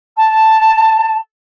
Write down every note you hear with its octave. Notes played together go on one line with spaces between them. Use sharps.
A5